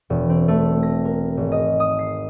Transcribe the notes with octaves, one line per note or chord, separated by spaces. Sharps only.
E1
C4
A3
A#6
A#4
G#1
D#5
D#6
C7